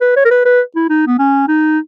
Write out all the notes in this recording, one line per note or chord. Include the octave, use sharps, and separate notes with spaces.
B4
C#5
A#4
B4
B4
E4
D#4
B3
C#4
D#4